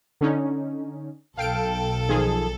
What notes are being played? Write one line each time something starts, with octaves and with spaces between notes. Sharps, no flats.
D3 C#4 D#4
B1 A4 F5 G5 D7
D#3 F3 G#4